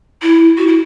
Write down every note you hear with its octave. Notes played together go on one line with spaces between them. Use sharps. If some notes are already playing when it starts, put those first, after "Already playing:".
E4
F#4
E4